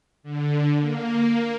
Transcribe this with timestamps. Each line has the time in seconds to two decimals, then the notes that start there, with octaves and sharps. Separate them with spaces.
0.23 D3
0.80 A#3